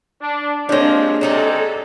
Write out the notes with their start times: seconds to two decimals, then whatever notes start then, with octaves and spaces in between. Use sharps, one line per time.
0.21 D4
0.69 F3 G#3 A#3 C4 D4 G4 C#5
1.21 C3 F#3 D#4 G#4 A4